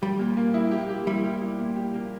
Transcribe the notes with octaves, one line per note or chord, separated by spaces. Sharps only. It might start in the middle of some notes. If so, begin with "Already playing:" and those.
G3 G4
A#2
A#3
E4
G4
G4
G3 E4
G4
E4
A#2
G4
A#3